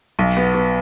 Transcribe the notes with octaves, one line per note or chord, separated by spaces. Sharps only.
B1
B3
B3